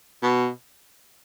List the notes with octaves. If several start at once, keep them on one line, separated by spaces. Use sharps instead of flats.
B2